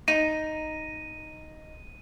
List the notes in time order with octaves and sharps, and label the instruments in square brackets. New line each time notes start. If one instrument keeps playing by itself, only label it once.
[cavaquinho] D#4 [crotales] D#7